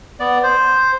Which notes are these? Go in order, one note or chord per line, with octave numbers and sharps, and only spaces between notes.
B3 D5
C5